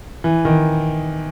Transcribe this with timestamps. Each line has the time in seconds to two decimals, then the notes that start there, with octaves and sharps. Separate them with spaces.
0.24 E3
0.45 D#3